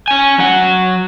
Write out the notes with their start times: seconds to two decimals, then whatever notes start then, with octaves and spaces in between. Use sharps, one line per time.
0.08 C#4 G#5
0.38 F#3 F#5